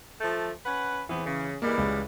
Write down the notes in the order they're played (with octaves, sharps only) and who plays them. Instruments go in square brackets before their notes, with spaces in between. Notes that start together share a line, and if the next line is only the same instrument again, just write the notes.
[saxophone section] F3 A3
C#4 B4 F#5
[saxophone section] E2 B3 C4 [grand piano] E3
[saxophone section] C#3
[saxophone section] E3 G3 G#3 [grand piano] A#3
[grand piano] C#2